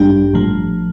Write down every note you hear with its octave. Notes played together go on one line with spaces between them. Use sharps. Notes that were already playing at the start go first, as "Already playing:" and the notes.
Already playing: A1 G2 G3 D4 G4
A1 A2 F3